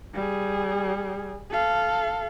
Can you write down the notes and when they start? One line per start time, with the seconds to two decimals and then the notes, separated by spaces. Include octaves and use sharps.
0.14 G3 G#4
1.51 A4 F5